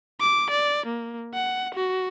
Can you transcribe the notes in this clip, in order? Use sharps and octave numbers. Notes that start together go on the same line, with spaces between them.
D6
D5
A#3
F#5
F#4